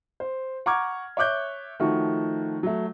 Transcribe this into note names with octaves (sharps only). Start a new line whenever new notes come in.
C5
F#5 A#5 C#6 D6 F6 G#6
C#5 E5 D6 F#6 G6
D#3 F3 A3 F#4 C#6
F#3 A3